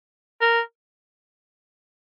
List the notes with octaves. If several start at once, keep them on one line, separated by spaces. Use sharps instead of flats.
A#4